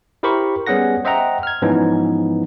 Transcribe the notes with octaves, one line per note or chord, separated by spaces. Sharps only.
E4 G4 A#4 C5 B5 C#6
G3 B3 C#4 G#4 F#5 A#6
C5 D#5 E5 F#5 G5 A#5
F6 G#6
G#2 E3 F3 B3 C#4 D#4